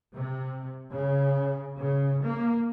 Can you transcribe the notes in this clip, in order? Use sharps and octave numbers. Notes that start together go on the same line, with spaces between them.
C3
C#3
C#3
A#3